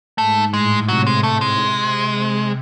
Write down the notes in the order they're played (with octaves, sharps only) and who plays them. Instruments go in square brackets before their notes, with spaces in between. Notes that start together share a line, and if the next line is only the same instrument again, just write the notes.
[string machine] G#2 [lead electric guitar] A3
[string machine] A2 [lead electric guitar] G#3
[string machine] C3 [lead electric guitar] F#3
[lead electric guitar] G#3
[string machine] C3 [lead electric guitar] A3
[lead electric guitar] G#3
[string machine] C3